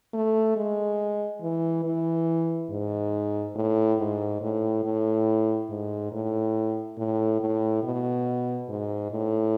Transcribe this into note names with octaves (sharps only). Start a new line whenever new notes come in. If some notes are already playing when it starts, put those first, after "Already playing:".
A3
G#3
E3
E3
G#2
A2
G#2
A2
A2
G#2
A2
A2
A2
B2
G#2
A2